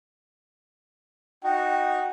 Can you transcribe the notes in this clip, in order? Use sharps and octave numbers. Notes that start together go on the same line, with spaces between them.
D#4 F#4 G5